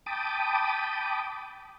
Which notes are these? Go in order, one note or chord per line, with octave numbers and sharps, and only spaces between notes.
G5 A5 B5 D6 D#6